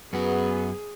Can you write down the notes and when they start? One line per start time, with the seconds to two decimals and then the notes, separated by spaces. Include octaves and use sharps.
0.13 F#2 B3 F#4 G#4